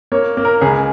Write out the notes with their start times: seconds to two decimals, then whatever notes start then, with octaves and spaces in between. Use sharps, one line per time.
0.12 A#3 C#5
0.37 A#3
0.45 A#4
0.61 C#2 G#4